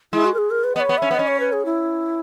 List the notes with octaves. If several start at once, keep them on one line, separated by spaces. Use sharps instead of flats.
G#3 E4
F#4
A#4
G#4
A#4
B4
B3 D#5
C#5
B3
C#4 E5
B3
C#4 D#5
C#5
B4
G#4
E4